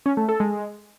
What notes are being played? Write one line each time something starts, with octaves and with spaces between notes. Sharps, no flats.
C#4
A3
A4
G#3